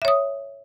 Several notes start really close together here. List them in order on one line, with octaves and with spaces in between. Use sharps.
E5 C#5 D#6